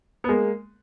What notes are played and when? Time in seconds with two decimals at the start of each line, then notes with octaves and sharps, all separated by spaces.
0.24 B3
0.28 G#3 A#3